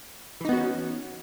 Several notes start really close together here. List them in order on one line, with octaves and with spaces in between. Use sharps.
E3 D#4 B3 F#4 C#4